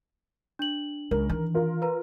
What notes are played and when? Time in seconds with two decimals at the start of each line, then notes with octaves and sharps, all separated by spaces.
0.59 D4 F#7
1.11 C#2 A#4
1.29 D#3 E3
1.54 F4 A#4
1.82 B4 A#5